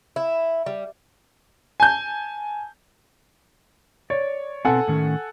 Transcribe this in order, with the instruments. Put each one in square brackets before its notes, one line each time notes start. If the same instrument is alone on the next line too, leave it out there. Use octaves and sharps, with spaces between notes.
[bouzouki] E4
G3
[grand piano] G#5 A5 G6
[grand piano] C#5 [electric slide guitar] D5
[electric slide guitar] B2 B3 C4 [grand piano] A4 F#5 G#5
[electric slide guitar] A2 D#3 C#4